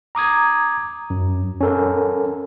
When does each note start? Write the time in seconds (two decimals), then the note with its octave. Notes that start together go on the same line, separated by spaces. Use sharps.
0.15 A#5 D6 D#6 G#6
1.10 F#2
1.61 C#4 A4 A#4